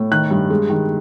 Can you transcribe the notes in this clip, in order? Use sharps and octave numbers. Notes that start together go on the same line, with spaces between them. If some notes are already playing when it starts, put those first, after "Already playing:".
Already playing: A2
D#3 F#6
G2
G#3
D#3